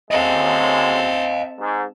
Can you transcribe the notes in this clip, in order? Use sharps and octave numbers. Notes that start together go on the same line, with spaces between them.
F#2 G#3 C4 A4 D#5 F5
G#2